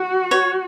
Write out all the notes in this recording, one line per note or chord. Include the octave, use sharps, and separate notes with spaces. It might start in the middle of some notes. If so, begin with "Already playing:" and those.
Already playing: F#4
C#5